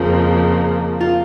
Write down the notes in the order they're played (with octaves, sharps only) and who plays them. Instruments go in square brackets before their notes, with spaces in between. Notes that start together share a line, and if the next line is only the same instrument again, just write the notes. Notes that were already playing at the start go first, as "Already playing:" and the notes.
Already playing: [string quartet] F2 C#3 F3 A#3 [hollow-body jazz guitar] F4
[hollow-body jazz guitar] F4